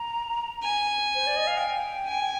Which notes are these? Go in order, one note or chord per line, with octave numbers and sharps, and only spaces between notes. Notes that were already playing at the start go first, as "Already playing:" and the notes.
Already playing: A#5
G#5
C5
D5
D#5
F5
G5
G#5